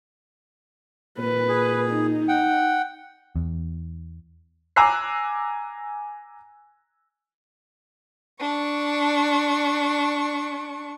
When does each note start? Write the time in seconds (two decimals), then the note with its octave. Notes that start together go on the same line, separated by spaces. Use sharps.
1.19 A#2 B4
1.49 G#4
1.89 D#4
2.28 F#5 G5
3.36 E2
4.76 G#5 A#5 D6 E6 F#6 C7
8.40 D4 C#6